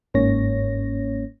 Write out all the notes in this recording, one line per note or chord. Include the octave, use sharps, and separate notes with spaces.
G1 G#2 A#3 C#4 C#5 A#6